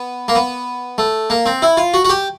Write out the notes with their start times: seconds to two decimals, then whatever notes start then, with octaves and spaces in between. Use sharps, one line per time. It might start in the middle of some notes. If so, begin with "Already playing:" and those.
Already playing: B3
0.28 A#3
0.35 B3
0.98 A3
1.30 A#3
1.46 C4
1.62 E4
1.77 F4
1.94 F#4
2.05 F#4
2.09 G4